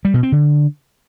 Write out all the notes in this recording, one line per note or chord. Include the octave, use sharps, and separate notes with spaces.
G3
B2
C4
D3